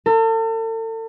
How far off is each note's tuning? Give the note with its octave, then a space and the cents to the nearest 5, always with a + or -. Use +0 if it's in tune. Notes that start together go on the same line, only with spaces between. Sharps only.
A4 +40